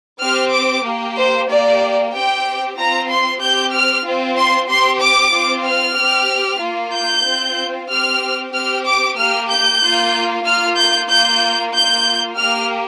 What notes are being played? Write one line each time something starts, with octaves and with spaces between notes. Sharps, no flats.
C4 G4 F6
D6
A#3 G4
C5
A#3 G4 D5
C4 G4 G5
C4 F4 A#5
C6
C4 G4 G6
F6
C4 F4
C6
C4 G4 C6
D6
C4 F4
F6
C4 G4
A#3 F4
G6
C4 F4
C4 G4 F6
C4 G4 F6
D6
A#3 G4 F6
G6
A#3 F4
A#3 F4 F6
G6
A#3 F4 G6
A#3 F4 G6
A#3 G4 F6